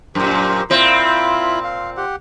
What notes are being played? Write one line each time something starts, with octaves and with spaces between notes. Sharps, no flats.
F#2 A#2 G4 A#4 C5
A#2 C4 E4 F4 B5
F5
G4 F#5